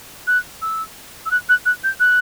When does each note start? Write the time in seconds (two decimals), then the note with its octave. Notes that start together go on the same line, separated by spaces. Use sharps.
0.27 F#6
0.62 E6
1.26 E6
1.31 F#6
1.49 F#6
1.66 F#6
1.84 G6
2.00 F#6